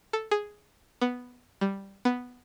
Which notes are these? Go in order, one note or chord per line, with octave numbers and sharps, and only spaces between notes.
A4
G#4
B3
G3
B3